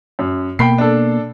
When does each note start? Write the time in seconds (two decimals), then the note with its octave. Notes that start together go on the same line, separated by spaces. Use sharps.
0.19 F#2
0.59 B2 A#3 G5 B5 C7
0.78 D4 A4